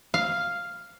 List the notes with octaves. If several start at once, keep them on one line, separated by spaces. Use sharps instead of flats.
F5